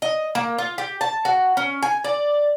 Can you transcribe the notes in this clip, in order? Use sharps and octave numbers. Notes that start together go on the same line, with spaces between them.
D#5
A#3
F4
G4
A5
F#4
C#4
G#5
D5